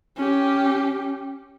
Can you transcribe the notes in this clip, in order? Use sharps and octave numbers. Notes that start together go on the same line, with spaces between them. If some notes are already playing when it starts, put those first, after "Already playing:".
C#4 G4